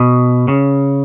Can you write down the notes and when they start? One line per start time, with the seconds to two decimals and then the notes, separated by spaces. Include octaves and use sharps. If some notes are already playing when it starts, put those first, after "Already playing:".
Already playing: B2
0.48 C#3